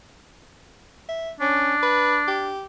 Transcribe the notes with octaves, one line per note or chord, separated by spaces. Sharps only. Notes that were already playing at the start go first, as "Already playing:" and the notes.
E5
C#4 D4
B4
G4